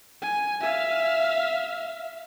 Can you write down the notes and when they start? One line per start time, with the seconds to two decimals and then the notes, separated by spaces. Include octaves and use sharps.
0.22 G#5
0.60 E5 F5